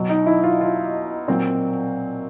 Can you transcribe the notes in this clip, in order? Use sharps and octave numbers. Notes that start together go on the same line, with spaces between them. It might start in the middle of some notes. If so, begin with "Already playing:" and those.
Already playing: B2 F#3
D#4
E4
F4
F4
A#2 F#3 C4